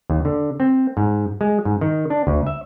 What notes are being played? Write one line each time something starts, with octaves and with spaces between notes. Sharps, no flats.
D#2
D3
C4
G#2
G#3
G#2
D#3
D4
D2
E5